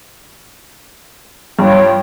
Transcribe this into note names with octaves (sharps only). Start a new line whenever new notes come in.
G2 F4 C#5 G5